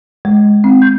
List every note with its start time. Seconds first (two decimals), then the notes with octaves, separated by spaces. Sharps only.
0.25 G#3
0.64 C4
0.82 G6